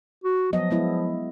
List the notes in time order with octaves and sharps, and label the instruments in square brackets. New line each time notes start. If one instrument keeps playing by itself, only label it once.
[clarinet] F#4
[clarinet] F3 [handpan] F#3 B3 D#5
[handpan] G#3 B3 E4